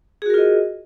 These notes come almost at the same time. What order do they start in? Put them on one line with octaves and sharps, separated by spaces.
G#4 F#4 A#4 F4 D#5